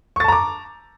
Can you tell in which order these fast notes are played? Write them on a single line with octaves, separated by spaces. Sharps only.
C#6 A6 A5 A#5 D6